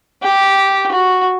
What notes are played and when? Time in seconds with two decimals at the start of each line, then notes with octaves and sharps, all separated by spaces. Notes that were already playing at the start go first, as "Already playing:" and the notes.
0.23 G4
0.92 F#4